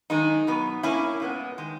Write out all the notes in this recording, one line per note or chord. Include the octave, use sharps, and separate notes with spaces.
F#2 D#3 G#3 D#4
B2 F#3 B3
A#2 A#3 C#4 E4
A#2 G#3 B3
D#3 G#3